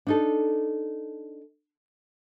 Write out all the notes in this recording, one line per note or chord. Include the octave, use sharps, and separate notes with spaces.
D4 D#4 A4